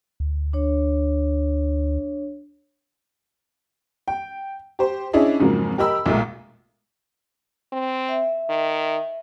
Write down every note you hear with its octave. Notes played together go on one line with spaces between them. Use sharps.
D2
D4 C#5
G5
G4 C5
C#4 D4 E4 G#4 D#5
F2 G#2 C#3 F3 F#3 A#3
G4 A#4 D#5 B5 E6
B1 A#2 G#3 A3
C4
E5
D#3